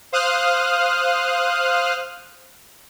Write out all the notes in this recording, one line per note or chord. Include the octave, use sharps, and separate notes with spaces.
C5 F5 D#6 F6 F#6